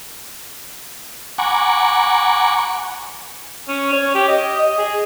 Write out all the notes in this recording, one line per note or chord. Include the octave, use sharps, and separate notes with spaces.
F#5 G#5 A#5 B5 C#6 D6
C#4
C#5
G4
D#5
D#5
G#4